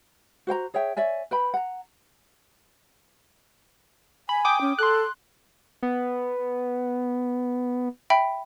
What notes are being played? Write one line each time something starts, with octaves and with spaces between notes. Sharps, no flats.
F#4 C5 G5 A#5
G#4 C#5 E5 G5
C#5 D5 E5 G#5
B4 G5 B5
F#5 A#5
G#5 B5
G5 D6 D#6
C#4
A4 C6 F#6
B3
E5 G5 B5